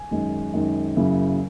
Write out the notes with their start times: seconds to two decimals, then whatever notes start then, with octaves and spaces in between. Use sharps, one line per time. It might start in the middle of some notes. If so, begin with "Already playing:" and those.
Already playing: G#5
0.11 F#2 D#3 G#3 D#4
0.53 F#2 D#3 G#3 D#4
0.96 F#2 C#3 F#3 A#3 E4